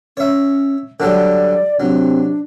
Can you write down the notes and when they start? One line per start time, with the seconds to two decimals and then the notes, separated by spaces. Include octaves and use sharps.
0.17 C#4 C#5 E5
1.00 D3 F#3 G3 D5
1.80 C3 F#3 D4